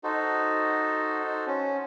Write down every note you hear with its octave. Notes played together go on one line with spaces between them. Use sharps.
D#4 F#4 A4 C5
C#4